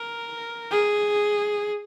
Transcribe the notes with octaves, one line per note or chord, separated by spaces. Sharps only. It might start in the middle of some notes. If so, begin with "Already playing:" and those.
Already playing: A#4
G#4